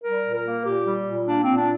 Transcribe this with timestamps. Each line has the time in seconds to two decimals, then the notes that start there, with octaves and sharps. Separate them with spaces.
0.04 G3 A#4
0.24 A#2
0.34 A#4
0.45 A#3
0.65 A#2 G4
0.85 G3
1.05 A#2
1.25 A#3 D4
1.40 C4
1.46 A#2
1.56 D4